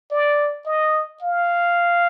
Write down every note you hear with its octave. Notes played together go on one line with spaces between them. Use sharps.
D5
D#5
F5